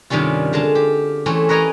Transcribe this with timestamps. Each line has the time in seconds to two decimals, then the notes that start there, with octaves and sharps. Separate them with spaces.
0.10 G2 C3 D#3 G3 C#4 F4
0.53 D3 G#3 F5 A5
0.75 G4
1.26 E3 A3 C4 C#4
1.49 A#4 B4 C#5 D#5 G#5 A#5